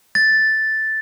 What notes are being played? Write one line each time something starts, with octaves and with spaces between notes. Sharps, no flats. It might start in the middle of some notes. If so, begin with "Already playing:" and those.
A6